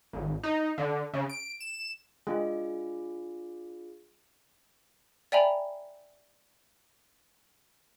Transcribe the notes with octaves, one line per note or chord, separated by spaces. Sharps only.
G#1
D#4
D3
C#3
D7
E7
G#3 D4 F4 G#4
D5 E5 G5 G#5 A#5 B5